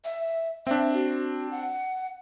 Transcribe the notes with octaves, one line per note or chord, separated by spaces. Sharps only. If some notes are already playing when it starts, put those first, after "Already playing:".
E5
C4 D4 E5
F#4
F#5